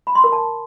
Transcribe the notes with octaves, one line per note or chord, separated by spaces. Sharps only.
B5
C6
A#4
A5